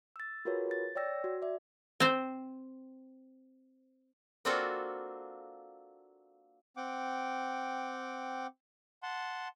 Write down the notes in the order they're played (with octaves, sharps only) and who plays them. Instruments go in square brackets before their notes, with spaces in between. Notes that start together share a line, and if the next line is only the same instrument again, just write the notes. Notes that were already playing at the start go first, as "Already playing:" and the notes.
[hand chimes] E6 A6
F4 F#4 G#4 A#4 B4 C#5
A6
C#5 D5 G5 E6 A#6
F#4
D5 E5
[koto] C4 C5
A#3 C4 D4 F4 F#4 A4
[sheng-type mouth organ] C4 F#5 G5 D6
F#5 A5 C6